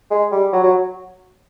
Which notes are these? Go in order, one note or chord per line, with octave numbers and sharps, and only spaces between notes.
G#3
G3
F#3
F#3